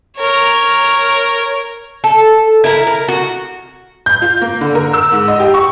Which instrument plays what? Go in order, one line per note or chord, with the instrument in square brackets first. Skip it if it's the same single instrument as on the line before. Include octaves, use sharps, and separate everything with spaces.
[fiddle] A#4 C#5
[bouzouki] A4
E4 A#4
A#4
F#4
[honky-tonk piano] G6
F4
A#3
D3
A#4
E6
G#2
D#5
G4
C#6